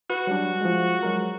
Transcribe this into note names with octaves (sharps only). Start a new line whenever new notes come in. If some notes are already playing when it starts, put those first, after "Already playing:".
F#4 B4
F#3 G3 D4
F3 G#3
F#3 G#3 A#4